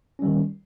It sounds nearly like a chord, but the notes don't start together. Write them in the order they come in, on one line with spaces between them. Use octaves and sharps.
C#4 G3 D#3